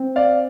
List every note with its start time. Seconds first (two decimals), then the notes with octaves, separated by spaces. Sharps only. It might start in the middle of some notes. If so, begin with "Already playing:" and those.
Already playing: C4
0.16 D5 F5